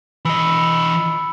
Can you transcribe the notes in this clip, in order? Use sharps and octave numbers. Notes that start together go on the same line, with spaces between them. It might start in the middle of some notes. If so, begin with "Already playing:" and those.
E3 D#5 B5 E6 C#7